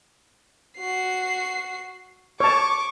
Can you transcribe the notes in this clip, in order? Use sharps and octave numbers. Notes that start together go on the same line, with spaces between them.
F#4 C7
C#5 A5 C#6 D6